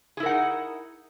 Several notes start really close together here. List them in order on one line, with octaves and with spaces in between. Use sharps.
G#4 E4 A#4 F#5 D#4